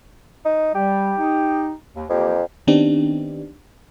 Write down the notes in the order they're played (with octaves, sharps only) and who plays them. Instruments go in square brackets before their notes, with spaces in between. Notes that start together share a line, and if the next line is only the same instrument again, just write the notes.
[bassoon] D#4
[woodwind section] G3 [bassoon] G4
[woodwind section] D#4
D#2
[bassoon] F2 [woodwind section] E3 A#3 G4
[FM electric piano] D#3 B3 C4 D4 D#4 G4